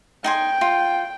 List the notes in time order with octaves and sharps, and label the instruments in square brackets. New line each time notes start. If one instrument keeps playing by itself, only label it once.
[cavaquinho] D#4 G#5 C6 [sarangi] G5
[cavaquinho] F4